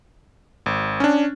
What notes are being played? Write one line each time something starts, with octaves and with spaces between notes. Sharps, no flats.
G#1
C#4 D4